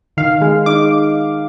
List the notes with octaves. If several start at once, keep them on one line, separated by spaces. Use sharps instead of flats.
D#3 F5
G#3
D#4 D6